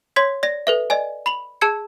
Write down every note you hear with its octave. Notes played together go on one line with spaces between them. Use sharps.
C#5 C6 G#6 B6
D5 A#6
A4 B4 E5
D5 D#5 G#5
B5 F7 F#7
G#4 A5 E6 G#6 C#7